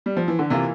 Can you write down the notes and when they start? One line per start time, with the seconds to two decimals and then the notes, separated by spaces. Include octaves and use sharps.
0.06 G3
0.17 F3
0.28 E3
0.39 D3
0.50 C3 E3 A#3 F4